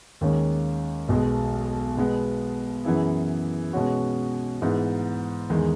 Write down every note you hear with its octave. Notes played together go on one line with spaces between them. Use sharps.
D#2 D#3 G#3 C#4
B1 B2 G#3
B2 G#3 B3
F#2 E3 B3 E4 G#4
B2 G#3 C#4 F#4
G#2 E3 B3
E2 D#3 G#3